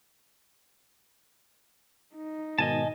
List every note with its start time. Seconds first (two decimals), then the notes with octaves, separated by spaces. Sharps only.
2.15 D#4
2.59 G#2 B2 D#3 D#5 G#5 A5